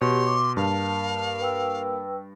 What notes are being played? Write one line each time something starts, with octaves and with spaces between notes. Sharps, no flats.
B2 G4 C#5 C6
D6
G2 A#3 F5 A5
B4 G5 E6